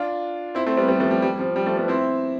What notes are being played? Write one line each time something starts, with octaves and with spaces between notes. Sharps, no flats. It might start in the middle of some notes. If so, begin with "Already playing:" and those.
Already playing: D4 F4
C4 E4
A3 C4
G3 B3
G3 B3
F3 A3
G3
G3
F3
G3
F3 A3
G3 B3
C4 E4